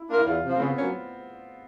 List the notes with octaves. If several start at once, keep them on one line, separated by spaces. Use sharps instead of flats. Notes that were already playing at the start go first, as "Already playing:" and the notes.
Already playing: E4
A#3 D4 F4 A#4
E4
E2 F4
C3 F3
C4
C#3 B3
F#3 A#3 C#4